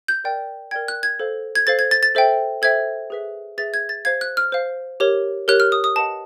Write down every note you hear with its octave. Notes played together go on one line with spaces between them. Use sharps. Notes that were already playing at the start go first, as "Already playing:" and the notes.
G6
A#4 D5 G5
A#4 D5 G5 G#6
F#6
G#6
A4 C5 F5
G#6
A4 C5 F5 A6
G#6
A6
A6
A4 C5 E5 G5
A4 C5 E5 G5 G#6
G#4 B4 E5
G#4 B4 E5 A6
G#6
A6
C5 F5 G#6
F#6
F6
C5 F5
G4 A#4 C#5
G4 A#4 C#5 F#6
F6
D#6
D#6
B4 D#5 F#5 A5